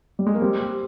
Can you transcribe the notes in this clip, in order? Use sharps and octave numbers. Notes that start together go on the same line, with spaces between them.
G3
G#3
A#3
G3 C4
G4